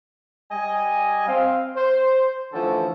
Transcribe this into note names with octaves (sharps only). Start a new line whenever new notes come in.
G3 D#5 G#5
C4 F5
C5
D3 E3 F3 A3 C#4 A4